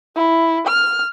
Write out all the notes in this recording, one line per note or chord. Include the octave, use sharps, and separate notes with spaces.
E4
F6